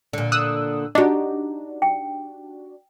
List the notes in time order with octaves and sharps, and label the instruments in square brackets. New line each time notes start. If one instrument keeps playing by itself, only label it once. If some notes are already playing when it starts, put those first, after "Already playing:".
[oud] A#2 D3
[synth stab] D#6 E6 F#6
[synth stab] D4 F#4 [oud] D#4 G4 [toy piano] D#5
[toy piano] G5